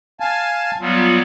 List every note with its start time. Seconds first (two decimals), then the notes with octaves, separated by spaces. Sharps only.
0.20 F5 G#5 A5
0.81 F#3 G3 B3 F4